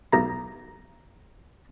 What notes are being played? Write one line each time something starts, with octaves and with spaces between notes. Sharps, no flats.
B1 A#5